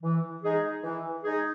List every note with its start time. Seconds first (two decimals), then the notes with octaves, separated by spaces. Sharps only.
0.03 E3
0.42 G#3 D#4 G#4
0.83 E3
1.23 G#3 D#4 G#4